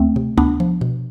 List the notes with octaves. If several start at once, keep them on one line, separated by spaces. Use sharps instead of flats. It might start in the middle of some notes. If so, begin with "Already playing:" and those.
Already playing: D2 A3 C4
C3
D2 B3 D4
F3
B2